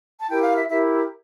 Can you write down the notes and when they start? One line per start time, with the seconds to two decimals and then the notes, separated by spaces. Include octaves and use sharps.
0.21 A5
0.29 E4 G4 A#4 G5
0.43 F5
0.56 E5
0.69 E4 G4 A#4 E5